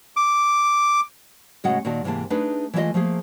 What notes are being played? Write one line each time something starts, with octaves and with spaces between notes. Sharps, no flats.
D6
A2 C#3 G#3 F#4 D#5 F#5
A#2 D#3 F#4 A5
G#2 C3 E3 A#3 A5
A3 D4 D#4 G#4 B4
E3 G#3 A3 D4 F4 D#5
F3 A3 A#3 G#4